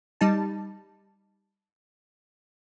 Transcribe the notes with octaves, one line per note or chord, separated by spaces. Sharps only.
G3 D#4 A5